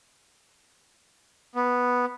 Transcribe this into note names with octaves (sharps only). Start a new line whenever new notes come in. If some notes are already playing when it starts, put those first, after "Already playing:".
B3